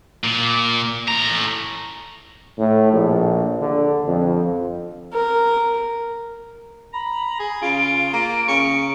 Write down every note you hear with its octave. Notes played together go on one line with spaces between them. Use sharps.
A#2
A2 A#5
A2
A#1
D3
F2
A#4
A#5 B5
G#4
C#3 F4 D7
A#3
C#3 C#6